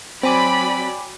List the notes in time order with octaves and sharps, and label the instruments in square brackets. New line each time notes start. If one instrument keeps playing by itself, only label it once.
[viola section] F#3 D5 B5 [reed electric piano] C4 [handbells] G5 G#5 D6